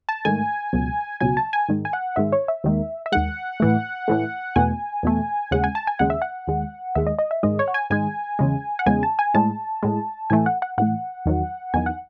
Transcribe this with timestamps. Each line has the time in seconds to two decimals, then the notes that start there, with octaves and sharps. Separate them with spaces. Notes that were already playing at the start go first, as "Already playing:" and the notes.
0.09 A5
0.25 G#2 D#3 A3 G#5
0.73 C#2 B2 F#3
1.20 C#2 B2 F#3 G#5
1.37 A5
1.53 G#5
1.68 G#2 D#3 G#3
1.85 G#5
1.93 F#5
2.16 G#2 D#3 G#3 E5
2.32 C#5
2.48 E5
2.64 D#2 D#3 G#3
3.06 E5
3.12 D#2 D#3 G#3 F#5
3.60 A2 E3 A3
4.08 A2 E3 A3
4.56 E2 B2 A3 G#5
5.03 E2 B2 A3
5.51 D#2 C#3 G#3 F#5
5.64 G#5
5.75 A5
5.87 G#5
5.99 D#2 C#3 G#3 F#5
6.10 E5
6.22 F#5
6.47 D#2 D#3 G#3
6.95 D#2 D#3 G#3 E5
7.07 D#5
7.19 D#5
7.31 E5
7.43 G#2 D#3 G#3 D#5
7.59 C#5
7.68 F#5
7.74 G#5
7.90 G#2 D#3 G#3 G#5
8.39 E2 C#3 G#3
8.79 F#5
8.86 E2 C#3 G#3 G#5
9.03 A5
9.19 G#5
9.34 A2 G#3 A5
9.83 A2 G#3
10.30 A2 E3 A3 G#5
10.46 F#5
10.62 F#5
10.78 A2 E3 A3 F#5
11.26 E2 D#3 F#3
11.74 E2 D#3 F#3 G#5
11.86 F#5